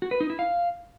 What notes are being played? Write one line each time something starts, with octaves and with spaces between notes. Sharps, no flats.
F#4
B4
D#4
E4
F5